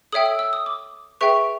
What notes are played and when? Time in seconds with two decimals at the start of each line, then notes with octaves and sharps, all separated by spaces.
0.12 A4 C#5 E5 G5 D#6
0.26 E6
0.39 E6
0.53 D#6
0.66 D6
1.21 G#4 B4 E5 G5 C#6